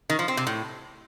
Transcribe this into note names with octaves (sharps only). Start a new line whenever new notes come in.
D#3
F3
C4
C3
A2